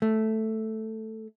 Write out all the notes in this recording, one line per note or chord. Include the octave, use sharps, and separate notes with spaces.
A3